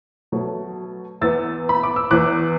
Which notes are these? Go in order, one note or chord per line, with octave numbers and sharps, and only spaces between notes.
B2 F#3 A3
E2 E3 B3 E6 A6
B5
D6
E6
E2 E3 B3 D6 F#6